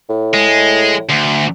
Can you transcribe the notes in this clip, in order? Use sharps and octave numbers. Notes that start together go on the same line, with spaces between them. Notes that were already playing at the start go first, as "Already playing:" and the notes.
A2
G#3
D2